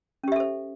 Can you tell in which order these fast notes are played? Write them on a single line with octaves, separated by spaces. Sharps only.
C#4 G4 E5 A4 C5